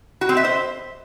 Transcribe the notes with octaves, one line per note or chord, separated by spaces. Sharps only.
F#4
C4
E5
C5